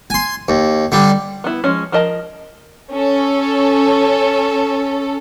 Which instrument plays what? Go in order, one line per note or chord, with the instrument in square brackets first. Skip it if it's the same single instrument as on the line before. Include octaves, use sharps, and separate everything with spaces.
[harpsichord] G#5 C6
D#2
D3 G3
[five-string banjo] B3 E4
F3 G#3 C#4
F3 A#4 D#5 A5
[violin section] C#4 A4